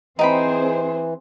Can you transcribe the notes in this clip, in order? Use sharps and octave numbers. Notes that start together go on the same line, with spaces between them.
E3 C4 D#4 G#4 C5 G5 B5